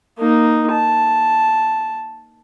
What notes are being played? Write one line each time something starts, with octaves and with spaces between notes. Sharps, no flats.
A#3 D#4
A5